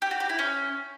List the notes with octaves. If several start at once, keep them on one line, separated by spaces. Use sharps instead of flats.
G4
F#4
G4
E4
C#4